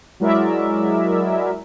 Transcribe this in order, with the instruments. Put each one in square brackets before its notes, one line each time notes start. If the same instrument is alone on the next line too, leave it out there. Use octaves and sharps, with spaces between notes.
[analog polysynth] F#3 G#3 E4 A#4 D5 E5